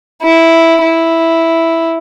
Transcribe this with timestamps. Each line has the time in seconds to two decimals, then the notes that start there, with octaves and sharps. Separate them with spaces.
0.22 E4
0.81 E4